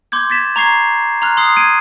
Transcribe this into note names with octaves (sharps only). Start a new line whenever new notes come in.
C6 D6 G6 G#6
G#6 A6 B6 E7
A#5 C#6 G#6 C7
A#5 C6 F6 F#6
C6 D#6 C7
G#6 D7 D#7